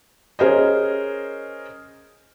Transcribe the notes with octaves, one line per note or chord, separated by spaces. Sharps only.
C#4 G#4 A#4 C5 D#5